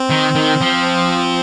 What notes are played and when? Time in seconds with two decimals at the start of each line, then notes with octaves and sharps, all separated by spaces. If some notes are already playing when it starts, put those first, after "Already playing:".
Already playing: C4
0.10 D#3
0.36 D#3
0.61 F3